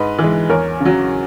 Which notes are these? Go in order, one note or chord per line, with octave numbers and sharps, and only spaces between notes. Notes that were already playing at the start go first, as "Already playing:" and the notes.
Already playing: G#2 B4 D#5
E3 G#3
E2 A#4 C#5
C#3
F#3